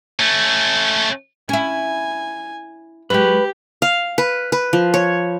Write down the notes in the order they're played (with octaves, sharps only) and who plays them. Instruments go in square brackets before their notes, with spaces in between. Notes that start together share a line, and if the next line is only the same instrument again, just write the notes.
[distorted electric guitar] A3 C#4
[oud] C#4 E4 [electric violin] G#5
[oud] F#3 G#3 [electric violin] G4 [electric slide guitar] B4
[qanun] F5
B4
B4
F3
C#5